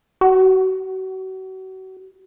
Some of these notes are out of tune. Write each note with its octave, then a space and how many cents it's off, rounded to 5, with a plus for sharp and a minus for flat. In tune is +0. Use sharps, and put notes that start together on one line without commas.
F#4 +35